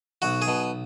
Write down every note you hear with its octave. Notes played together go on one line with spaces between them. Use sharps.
B1 F#4
G#4
B2